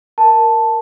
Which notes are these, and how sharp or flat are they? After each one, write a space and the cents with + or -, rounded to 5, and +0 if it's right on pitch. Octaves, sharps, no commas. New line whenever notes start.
A#4 +0 A5 +0